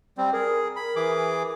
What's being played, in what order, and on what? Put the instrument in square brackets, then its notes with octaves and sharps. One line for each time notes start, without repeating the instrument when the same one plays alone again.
[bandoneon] G3 C4
[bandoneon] G#4 [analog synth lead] A#4
[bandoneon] B5
E3 G#4 D6